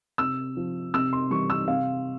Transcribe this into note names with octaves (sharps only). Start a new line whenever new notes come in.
C3 E6
F3
C3 E6
C6
E3 G3 C#6
E6
C3 F5